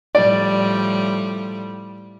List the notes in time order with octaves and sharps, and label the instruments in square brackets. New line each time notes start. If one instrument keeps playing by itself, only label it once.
[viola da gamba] A2 F3 G3 [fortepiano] D5